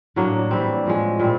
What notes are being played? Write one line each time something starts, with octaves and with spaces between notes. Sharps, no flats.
A2 F#3 A#3 D4
E3 G3 C4
A2 F3 G#3
A#2 G3 C4